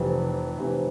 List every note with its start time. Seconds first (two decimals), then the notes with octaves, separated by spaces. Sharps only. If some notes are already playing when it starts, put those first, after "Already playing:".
Already playing: F1 F2 C3 E3
0.58 F1 F2 C3 E3